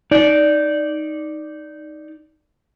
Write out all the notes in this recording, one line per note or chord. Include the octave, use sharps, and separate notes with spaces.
D#4 D5